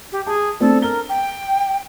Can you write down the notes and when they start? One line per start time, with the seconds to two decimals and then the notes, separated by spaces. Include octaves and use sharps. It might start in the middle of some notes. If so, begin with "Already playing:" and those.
0.12 G4
0.27 G#4 A5
0.60 A3 C4 D4 A4
0.82 A#4 G7
1.09 G5